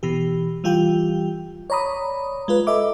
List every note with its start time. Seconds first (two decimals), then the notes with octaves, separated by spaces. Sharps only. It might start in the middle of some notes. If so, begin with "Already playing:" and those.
0.03 B2 E3 G4
0.64 E3 G3 F4 G4 G5
1.70 C#5 D5 A#5 B5 D#6
2.48 G#3 F4 B4
2.67 A4 D#5 E5 D6